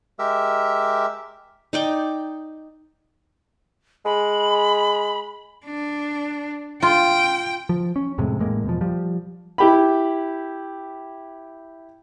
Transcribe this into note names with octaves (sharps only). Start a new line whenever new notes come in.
G#3 G4 A#4 E5 E6
D#4 D5 G5
G#3 B5
D4
F4 G5
F3
C#4
F2 A2 C3 G#3
A1 A2 G#3 A#3
E2 B2 F3
F3 G3
E4 G4 B5